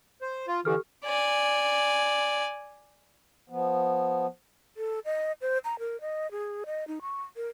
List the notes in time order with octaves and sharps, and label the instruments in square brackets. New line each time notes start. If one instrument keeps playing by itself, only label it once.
[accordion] C5
F4
[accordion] D3 E3 [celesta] G4 A4 F6
[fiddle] D5 G#5
[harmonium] F3 B3
[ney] A4
D#5
C5
A#5
A#4
D#5
G#4
D#5
D#4
C#6
A#4